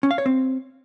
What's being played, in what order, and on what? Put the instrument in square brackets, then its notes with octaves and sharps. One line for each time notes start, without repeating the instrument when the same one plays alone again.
[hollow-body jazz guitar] C#4
F5
C#5
C4